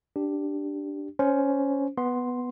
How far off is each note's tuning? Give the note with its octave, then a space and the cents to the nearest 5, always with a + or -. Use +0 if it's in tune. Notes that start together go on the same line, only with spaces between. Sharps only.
D4 +0 G4 +0
C#4 +10 C5 +0
B3 +0 C6 +0